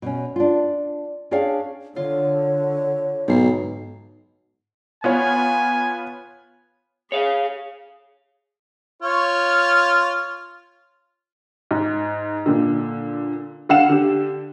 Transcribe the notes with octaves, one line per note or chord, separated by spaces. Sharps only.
B2 C#4
D4 F4
C#4 D4 G#4 C#5 F5 G5
D3 F4 C#5
B1 G#2 C7
B3 F4 C#5 G#5
G#4 C#5 F5
F4 C#5
G#2
A#2 D3
D3 F5 F#5 E7
D3 G4